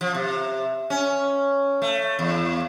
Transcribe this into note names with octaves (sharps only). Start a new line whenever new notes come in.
F3
C3
C#4
A3
E2